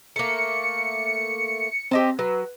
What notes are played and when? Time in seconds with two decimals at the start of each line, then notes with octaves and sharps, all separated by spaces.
0.16 A3 A#3 C#7
1.91 C4 G4 D#5 A5
2.19 F#3 B4